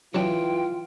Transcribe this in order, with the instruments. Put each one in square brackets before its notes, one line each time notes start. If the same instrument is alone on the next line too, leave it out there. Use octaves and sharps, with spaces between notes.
[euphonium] E3 [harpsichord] F#3 D4 [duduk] F4 [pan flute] G5